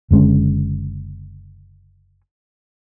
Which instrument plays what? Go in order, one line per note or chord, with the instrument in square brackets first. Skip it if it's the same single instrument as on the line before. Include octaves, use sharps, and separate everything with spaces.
[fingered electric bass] F#1 D3 G#3 C#4